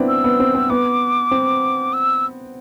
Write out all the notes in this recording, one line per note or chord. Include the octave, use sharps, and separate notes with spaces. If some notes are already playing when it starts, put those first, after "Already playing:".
Already playing: B3 C4 D4 E4
E6
B3
C4
C4
B3 D6
C4
E6